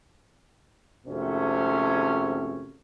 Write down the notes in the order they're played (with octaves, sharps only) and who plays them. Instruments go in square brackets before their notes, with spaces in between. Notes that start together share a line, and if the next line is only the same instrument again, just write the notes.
[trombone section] G#1 F2 C3 A3 C#4